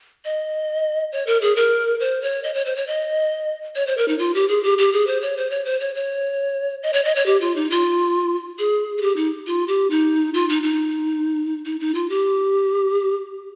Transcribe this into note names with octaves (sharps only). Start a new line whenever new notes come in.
D#5
C#5
A#4
G#4
A#4
C5
C#5
D#5
C#5
C5
C#5
D#5
C#5
C5
A#4
D#4
F4
G4
G#4
G4
G4
G#4
C5
C#5
C5
C#5
C5
C#5
C#5
D#5
C#5
D#5
C#5
G4
F4
D#4
F4
G#4
G#4
G4
D#4
F4
G4
D#4
F4
D#4
D#4
D#4
D#4
F4
G4